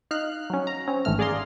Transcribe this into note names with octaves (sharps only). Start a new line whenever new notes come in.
D#4 F5 F6 F#6
F#3 C#4
A#5
C4 C#4
G#1 G#2 E3 A3 F6
G#4 D5 F5 A#5 C6